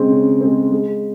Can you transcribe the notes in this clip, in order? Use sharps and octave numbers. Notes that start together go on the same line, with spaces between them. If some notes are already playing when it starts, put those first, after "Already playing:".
Already playing: C#3 G#3 C4
C#3
G#3 C4
G#3